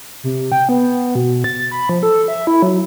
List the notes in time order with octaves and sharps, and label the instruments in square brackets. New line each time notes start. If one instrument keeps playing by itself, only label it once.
[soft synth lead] C3
G5
B3
B2
A6
B5
F3
A4
E5
E4
F#3